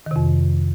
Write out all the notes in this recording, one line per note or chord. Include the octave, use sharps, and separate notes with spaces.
F2 C3 D#3